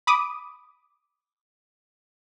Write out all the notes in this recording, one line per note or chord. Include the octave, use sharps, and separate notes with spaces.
B5 D6 D#6 D#7